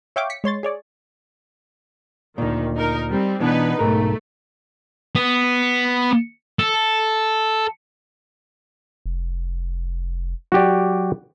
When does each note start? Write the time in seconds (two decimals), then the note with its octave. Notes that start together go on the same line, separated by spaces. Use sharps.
0.16 C#5 E5 F5 G5 C#6 D6
0.30 B6 C#7
0.44 G#3 C#5 C6 A6
0.63 G#4 C#5 D5
2.38 D2 A#2 D#3
2.75 D#4 A#4
3.09 G3 C4
3.40 B2 E3 B3 D4 D#4 B4
3.79 B1 G#2 A3 A#4
5.15 B3
6.59 A4
9.06 F1
10.52 F#3 F#4 G4 D5